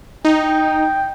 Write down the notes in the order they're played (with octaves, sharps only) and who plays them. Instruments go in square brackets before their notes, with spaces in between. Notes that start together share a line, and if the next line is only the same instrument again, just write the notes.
[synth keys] D#4 [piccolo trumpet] G5